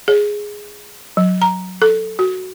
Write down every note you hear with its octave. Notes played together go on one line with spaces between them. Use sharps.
G#4
F#3
A#5
A4
F#4